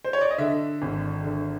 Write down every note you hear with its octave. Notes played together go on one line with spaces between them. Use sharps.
C5
C#5
D5
D#5
D3 E5
G#1
D3